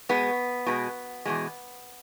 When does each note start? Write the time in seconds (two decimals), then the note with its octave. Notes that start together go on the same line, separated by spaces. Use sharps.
0.09 B2 G#3 B3
0.66 B2 G#3
1.25 E2 B2 G#3